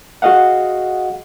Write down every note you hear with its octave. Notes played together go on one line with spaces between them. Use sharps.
F#4 G#4 D#5 F5 F#5